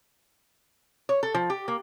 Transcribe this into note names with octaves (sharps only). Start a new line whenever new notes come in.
C#5
A4
F3
G4
A#3